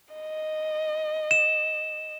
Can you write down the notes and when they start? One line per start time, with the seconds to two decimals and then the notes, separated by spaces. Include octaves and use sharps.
0.15 D#5
1.31 E7